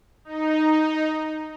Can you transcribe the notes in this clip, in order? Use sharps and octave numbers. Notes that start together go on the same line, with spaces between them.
D#4